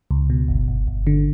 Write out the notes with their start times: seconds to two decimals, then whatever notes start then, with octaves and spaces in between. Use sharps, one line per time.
0.11 C#2
0.30 B2
0.48 G1
0.68 G1
0.87 G1
1.07 D3